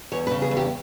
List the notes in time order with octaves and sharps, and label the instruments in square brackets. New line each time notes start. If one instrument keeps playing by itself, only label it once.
[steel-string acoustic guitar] E2 C#5
B4
C#3
G#4
E2
G4